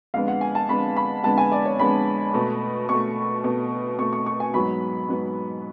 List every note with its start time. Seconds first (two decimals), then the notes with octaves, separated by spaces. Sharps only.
0.14 F2 D3 G#3 B3 F5
0.28 F#5
0.41 G#5
0.55 A5
0.69 F2 D3 G#3 B3 B5
0.96 B5
1.24 F2 D3 G#3 B3 A5
1.38 G#5
1.51 D5
1.65 C#5
1.79 F2 D3 G#3 B3 B5
2.34 B2 A3
2.89 B2 A3 C#6
3.44 B2 A3
3.99 B2 A3 C#6
4.13 C#6
4.26 C#6
4.40 G#5
4.54 G#2 F#3 B3 B5
5.08 G#2 F#3 B3